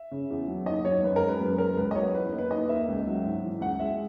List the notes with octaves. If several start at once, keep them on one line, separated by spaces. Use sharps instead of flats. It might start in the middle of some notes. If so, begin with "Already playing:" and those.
Already playing: E5
C#3
E2
F#3
D#2 D#5
F#3 C#5
F#2 B4
A#4
G#3
B4
F#2 B4
G#3 A#4
C#2 B4
D#5
F#3 C#5
E2 B4
B4
A#3
B4
D#2 D#5
A#3 E5
C#2
F#3
G#1
E3
C#2 F#5
G#3 E5